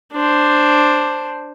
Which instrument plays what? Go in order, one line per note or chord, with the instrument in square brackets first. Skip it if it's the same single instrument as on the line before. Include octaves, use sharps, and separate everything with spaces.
[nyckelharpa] D4 C5